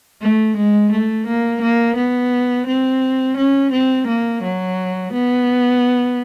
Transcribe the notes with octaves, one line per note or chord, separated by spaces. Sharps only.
A3
G#3
A3
A#3
A#3
B3
C4
C#4
C4
A#3
F#3
B3